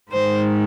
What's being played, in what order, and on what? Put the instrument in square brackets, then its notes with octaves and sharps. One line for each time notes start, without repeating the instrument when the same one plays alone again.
[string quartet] G#2 D#3 G#3 C5